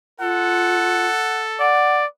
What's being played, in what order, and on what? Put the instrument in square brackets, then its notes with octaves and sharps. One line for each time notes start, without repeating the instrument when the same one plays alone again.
[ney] F4 [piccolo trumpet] A4 [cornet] F#5
[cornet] D5 [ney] F#5